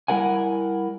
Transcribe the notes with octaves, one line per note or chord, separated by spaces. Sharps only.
G3 E4 A#4 F#5 G#5